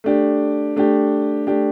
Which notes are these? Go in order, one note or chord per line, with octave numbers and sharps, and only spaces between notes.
A3 D4 G4
A3 D4 G4
A3 D4 G4